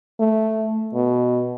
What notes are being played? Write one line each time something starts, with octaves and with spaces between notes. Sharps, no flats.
A3
B2